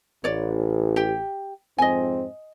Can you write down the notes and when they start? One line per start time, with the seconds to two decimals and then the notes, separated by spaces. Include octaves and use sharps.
0.24 A1 C#5 D5
0.96 G4 G5
1.78 F2 G#2 C4 D#5 G#5